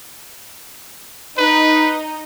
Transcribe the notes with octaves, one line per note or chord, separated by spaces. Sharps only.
D#4 B4